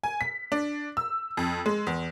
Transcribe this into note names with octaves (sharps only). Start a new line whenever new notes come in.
G#5
B6
D4
E6
F2
G#3
E2